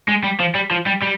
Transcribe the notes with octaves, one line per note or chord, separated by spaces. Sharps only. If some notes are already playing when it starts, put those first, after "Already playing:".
G#3
G3
F3
G3
F3
G3
G3